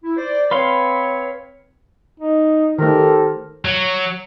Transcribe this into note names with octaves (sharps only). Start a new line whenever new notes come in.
E4
C5 D5
C4 B4 C#5 F5 C6
D#4
D#3 A3 G4 A4 A#4 C5
F#3